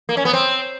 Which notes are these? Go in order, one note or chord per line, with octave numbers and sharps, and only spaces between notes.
A#3
C#4
B3
C4